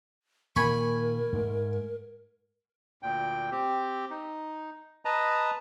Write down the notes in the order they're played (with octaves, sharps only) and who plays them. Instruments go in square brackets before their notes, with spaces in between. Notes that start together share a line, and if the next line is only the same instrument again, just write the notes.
[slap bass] A#2 D#3 [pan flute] A#4 [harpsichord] G#5 B5 C#6
[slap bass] G#2 A3
[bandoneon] D2 A#2 G5
C4 G4
D#4
B4 D#5 A5 A#5